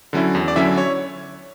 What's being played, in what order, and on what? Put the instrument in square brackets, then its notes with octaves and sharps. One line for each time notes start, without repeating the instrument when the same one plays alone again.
[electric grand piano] D3 F#3 C#4 E4
E2
D5
D3 F#3 C#4 E4 E5
C#5